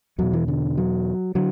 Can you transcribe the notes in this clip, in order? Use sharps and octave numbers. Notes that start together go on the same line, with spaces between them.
E2 B2 F#3
E3
D3
F#3
D3 F#3